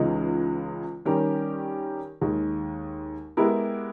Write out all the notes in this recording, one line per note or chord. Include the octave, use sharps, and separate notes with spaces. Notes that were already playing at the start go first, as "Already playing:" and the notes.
Already playing: C#2 C#3 E3 G#3 D#4
D#3 G3 C#4 G4 A#4
D#2 D#3 G#3
G#3 B3 E4 G4 A#4